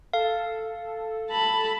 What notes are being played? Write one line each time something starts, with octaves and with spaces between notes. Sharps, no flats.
A4 F5
A5 B5